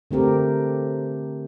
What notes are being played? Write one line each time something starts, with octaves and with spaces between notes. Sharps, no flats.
D3 A3 C4 G4 A#4